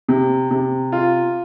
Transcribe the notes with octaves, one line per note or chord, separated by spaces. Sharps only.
C3
C3
F4